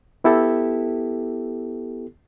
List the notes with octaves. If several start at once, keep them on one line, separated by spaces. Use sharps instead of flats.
B3 E4 G4 A4